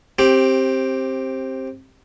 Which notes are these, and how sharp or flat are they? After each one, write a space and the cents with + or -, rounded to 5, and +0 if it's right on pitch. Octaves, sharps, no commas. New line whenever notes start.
C4 +15 G4 +0